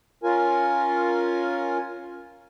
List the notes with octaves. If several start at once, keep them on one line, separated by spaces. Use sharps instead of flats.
C#4 F4 A#4 G#5